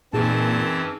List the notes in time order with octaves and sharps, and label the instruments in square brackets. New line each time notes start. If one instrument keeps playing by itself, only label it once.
[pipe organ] F#2 E3 C4 [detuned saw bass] A#2 [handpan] D#4 G#4 [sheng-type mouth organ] A5